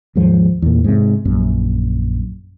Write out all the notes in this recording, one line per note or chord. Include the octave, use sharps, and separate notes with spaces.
D#2 G#2 F3
E2 A#2
G#2 C3
A#1 F#2